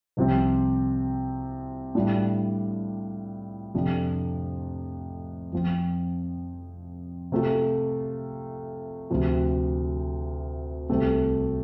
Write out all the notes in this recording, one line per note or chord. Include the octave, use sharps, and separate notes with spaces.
C2 C3 F3 C4
A2 G3 D4 F4
F2 C3 F3 A3 D4
F2 F3 C4
C3 A3 F4
D2 C3 F3 C4
C2 C3 A3 C4